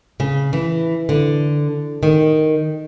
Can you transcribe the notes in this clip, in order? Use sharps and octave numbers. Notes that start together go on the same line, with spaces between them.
C#3
E3
D3
D#3